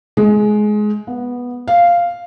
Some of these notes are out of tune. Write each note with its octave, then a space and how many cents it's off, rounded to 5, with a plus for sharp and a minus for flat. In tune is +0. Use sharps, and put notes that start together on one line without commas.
G#3 +20
B3 -10
F5 -5